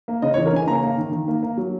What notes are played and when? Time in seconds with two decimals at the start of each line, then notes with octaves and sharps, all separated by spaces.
0.08 A#3
0.22 C#3 D#5
0.34 C#5
0.38 E3
0.46 A#4
0.53 C#3 G#5
0.68 A#3 A#5
0.83 A#3
0.98 D#3
1.12 D#3
1.28 A#3
1.43 A#3
1.57 F#3